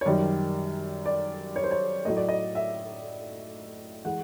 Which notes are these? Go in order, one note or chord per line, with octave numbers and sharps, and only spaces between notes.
C#5
F#2 D#3 G3 D5
D5
C#5
C5
C#5
A2 F#3 A3 D#5
D5
D#5
E5
E3 G#3 F#5